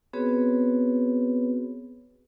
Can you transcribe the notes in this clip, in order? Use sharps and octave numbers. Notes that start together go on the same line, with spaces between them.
B3 C4 F#4 G#4 B4 C#5